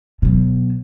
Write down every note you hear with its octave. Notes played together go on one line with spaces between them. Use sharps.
B2 F#3